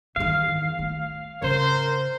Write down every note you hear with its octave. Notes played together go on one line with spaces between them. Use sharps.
E2 D#3 F5
A3
C#3 A#4 C5